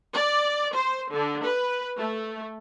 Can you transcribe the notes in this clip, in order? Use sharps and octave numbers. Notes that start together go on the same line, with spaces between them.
D5
C5
D3
B4
A3